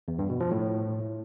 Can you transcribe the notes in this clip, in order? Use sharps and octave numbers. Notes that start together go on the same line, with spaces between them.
E2
G2
B2
F3
A2